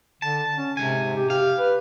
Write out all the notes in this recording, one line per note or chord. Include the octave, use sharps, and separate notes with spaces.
D3 A5
C#4
G#2 C3 G#5
G4
G4 F5
B4